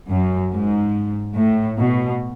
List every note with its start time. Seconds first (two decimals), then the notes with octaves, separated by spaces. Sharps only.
0.11 F#2
0.53 G#2
1.37 A2
1.79 B2